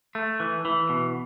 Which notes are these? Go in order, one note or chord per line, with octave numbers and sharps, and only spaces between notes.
A3
E3
E3
B2